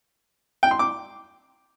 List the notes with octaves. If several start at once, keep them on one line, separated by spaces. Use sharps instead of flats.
G5
C6
D6